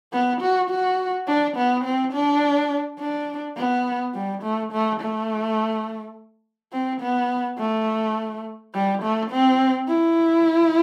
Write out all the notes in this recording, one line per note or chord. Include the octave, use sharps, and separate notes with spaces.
B3
F#4
F#4
D4
B3
C4
D4
D4
B3
G3
A3
A3
A3
C4
B3
A3
G3
A3
C4
E4